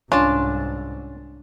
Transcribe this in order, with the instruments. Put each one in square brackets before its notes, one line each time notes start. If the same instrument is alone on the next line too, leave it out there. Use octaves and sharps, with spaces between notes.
[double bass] C2 G#2 [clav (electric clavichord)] C#4 [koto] D4 A5 [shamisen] F4